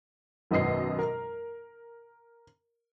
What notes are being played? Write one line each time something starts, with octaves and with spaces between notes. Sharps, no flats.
G#1 F#2 B2 D#5 C7
A#4